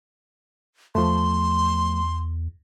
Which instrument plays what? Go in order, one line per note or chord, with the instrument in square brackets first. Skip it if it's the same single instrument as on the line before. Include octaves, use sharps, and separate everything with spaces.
[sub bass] E2 [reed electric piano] F3 A3 [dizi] C6